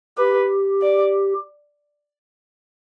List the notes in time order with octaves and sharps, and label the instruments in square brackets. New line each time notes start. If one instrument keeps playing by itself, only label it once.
[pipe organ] G4 [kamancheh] B4
[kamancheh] D5